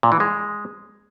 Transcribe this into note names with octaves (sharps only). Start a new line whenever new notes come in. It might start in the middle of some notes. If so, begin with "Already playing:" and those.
A#2
E3
G#3